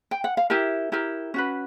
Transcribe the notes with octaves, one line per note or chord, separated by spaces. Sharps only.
G5
F#5
F5
E4 G4 A#4 E5
E4 G4 A#4
C#4 F#4 B4